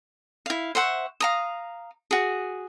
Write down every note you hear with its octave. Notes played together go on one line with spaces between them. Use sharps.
E4 F5
C5 E5 F#5 C#6
F5 A#5 D#6
F#4 G#4